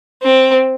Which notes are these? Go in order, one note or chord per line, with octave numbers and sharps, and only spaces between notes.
C4